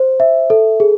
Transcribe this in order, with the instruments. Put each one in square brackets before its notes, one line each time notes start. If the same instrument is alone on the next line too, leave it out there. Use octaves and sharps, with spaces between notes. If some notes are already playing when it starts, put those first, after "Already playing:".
Already playing: [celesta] C5
E5
A4
G#4